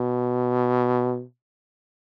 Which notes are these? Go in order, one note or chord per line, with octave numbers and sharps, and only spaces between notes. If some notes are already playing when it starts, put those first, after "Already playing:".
Already playing: B2